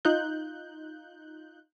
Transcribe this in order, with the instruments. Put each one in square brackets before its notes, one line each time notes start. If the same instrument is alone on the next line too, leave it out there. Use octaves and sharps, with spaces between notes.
[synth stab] D#4 F4 F#6 G6